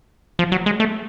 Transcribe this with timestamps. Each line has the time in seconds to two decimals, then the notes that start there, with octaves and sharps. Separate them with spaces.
0.39 F3
0.52 F#3
0.66 G#3
0.80 A3